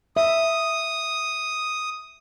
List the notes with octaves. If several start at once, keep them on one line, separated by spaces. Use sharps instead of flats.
E5 D#6